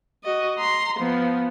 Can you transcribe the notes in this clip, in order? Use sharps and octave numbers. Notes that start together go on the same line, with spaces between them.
F#4 D#5
A#5 C6
F3 B3